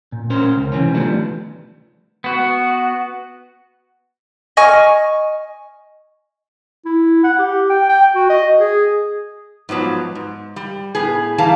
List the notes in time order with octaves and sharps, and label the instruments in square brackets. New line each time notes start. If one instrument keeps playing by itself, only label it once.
[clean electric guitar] A#2
C#4 A#4 C5
C#2
C3 E3 C4 C#4
D#3 F3 G3 A3 B3 D4
[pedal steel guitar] B3 F#4
[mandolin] D#5 G#5 C#6 F6
[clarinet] E4
F#5
G4
G5
G5
F#4
D#5
G#4
[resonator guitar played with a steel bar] G#2 F3 F#3 B3
G#2
G3
A2 B3 G#4
E3 G3 F5 A5 A#5